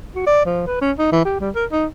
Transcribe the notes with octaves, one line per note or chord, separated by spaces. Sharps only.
F#4
D5
F3
B4
C#4
D#4
E3
G4
G3
A#4
D#4